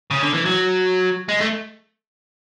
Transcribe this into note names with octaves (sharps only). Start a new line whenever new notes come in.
C#3
D3
E3
F#3
G#3
A3